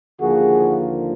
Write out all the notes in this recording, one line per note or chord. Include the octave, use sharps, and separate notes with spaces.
D#2 D3 F3 A#3 F#4 G#4